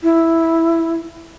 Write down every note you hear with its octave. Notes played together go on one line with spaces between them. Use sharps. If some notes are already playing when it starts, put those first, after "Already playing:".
E4